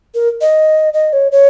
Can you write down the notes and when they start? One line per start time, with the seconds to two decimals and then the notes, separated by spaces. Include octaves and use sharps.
0.15 A#4
0.41 D#5
0.94 D#5
1.13 C#5
1.32 C#5